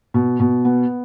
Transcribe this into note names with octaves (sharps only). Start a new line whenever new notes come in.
B2
B2
B3